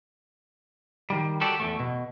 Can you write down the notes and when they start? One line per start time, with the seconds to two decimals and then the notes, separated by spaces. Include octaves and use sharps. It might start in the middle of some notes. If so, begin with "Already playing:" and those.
1.10 D#3 G3
1.41 F#4 G4 A4 D5
1.60 E2 G#2 A3
1.80 B2